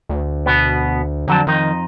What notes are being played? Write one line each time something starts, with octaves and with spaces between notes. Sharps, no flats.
D2
B2 B3
F2 D3 F#3 A5
F2 D#3 D#4